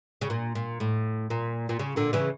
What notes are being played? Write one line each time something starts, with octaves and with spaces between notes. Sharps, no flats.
C#3
A#2
A#2
A2
A#2
A#2
C#3
A#2 D3
C#3 E3